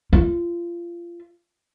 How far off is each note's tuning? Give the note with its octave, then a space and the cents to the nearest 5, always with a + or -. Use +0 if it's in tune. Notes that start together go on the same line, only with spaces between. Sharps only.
F4 -25